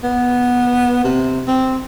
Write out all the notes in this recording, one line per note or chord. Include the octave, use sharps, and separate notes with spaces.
B3
C3
C4